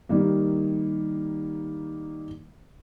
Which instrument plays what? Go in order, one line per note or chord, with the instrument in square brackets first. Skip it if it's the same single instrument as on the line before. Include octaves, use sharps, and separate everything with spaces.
[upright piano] D#3 G3 A#3